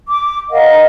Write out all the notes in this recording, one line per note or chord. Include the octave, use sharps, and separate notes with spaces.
D6
A#4 D#5 F5 F#5